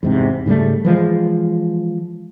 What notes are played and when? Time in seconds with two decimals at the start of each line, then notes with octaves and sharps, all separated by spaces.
0.03 E2 G#2 C3
0.46 G#2 C#3 G3 A3
0.85 E3 F3 G#3